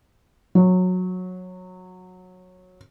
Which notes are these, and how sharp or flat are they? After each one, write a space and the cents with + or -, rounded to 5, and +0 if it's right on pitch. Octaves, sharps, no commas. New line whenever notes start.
F#3 -15